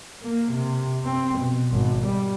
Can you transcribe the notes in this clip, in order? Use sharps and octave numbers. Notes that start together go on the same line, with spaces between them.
A#3
C3
C4
B2
G#1
G3